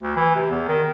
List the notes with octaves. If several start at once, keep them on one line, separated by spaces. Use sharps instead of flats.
D2
E3
C3
E2
D#3